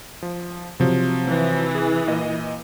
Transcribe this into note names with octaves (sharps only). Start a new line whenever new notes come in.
F3
C3 F3 F#3
E3
G#4
A#2 D#5